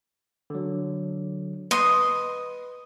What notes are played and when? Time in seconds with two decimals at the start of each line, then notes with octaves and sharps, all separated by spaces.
0.50 D3 F#3
1.71 B4 D#5 C6